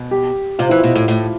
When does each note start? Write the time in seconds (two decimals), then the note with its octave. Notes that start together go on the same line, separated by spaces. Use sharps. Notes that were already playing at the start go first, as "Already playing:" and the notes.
Already playing: B2
0.11 G4
0.59 C3 F4
0.69 E3 E4
0.79 B2 F4
0.95 A2
1.08 A2